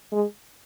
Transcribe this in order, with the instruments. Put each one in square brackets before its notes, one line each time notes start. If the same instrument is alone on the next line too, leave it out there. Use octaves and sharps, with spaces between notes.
[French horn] G#3